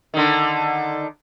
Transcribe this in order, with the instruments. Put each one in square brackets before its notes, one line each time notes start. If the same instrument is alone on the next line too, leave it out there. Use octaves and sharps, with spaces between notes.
[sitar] D3 D#3